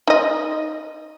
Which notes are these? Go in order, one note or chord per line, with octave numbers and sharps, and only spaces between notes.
D#4 D#5